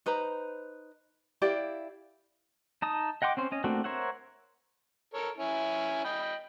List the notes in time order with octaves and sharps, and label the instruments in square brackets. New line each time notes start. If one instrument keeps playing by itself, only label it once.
[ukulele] D#4 B4 C5 A#5
E4 G4 D5 F5
[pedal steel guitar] D#4 A5 D#6
D#5 F#5 G5 C6 D6
C4 C#4 C5
C#4 D#5
A3 A#3 C4 D4 F#4
A#4 C5 C#5 E5 F#5
[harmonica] A4 A#4 C#5
C#4 E4 G#5
D#5 G5 B5